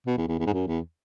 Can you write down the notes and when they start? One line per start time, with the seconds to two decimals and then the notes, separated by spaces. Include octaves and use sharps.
0.07 B2
0.17 E2
0.28 E2
0.39 E2
0.46 G#2
0.53 F#2
0.67 E2